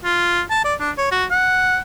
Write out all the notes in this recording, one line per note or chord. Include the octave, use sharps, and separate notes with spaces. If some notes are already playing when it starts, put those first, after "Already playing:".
F4
A5
D5
D4
C#5
F#4
F#5